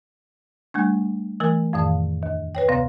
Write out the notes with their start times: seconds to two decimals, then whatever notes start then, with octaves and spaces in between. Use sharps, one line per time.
0.74 G3 A3 D4
1.40 E3 A3 A#4
1.73 F2 A2 D#3 F5
2.23 D#2
2.55 B4 C#5 G5
2.68 D2 C3 B3 F5